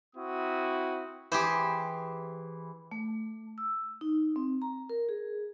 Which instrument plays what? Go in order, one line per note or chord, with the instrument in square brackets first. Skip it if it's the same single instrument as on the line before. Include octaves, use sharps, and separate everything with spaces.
[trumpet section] C4 E4 F#4 D#6
[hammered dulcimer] E3 [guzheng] G4 G#4 C5
[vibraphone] A3
E6
D#4
C4
A#5
A#4
G#4